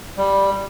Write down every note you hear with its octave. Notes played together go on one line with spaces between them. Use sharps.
G3